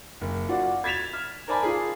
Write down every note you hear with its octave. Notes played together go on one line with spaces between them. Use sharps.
F#1
F4 F#4 D5
G#6 A6 B6 E7 F7
F6
A#4 C5 D5 G#5 A5 B5
F4 G#4